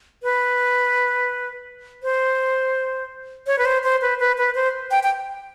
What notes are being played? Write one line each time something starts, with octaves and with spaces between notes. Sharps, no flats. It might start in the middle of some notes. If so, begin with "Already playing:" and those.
B4
C5
C#5
B4
C5
C5
B4
B4
B4
C5
G5
G5